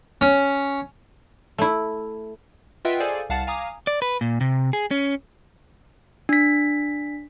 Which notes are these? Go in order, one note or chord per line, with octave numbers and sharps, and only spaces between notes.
C#4
A3 E4
F4 B4 D#5 E5 F#5 G5
G#4 A4 C5 D5 F5 G#5
C2 F5 F#5 A5 A6
F5 G#5 A#5 D6 D#6
D5
B4
A#2
C3
G#4
C#4
D4 B6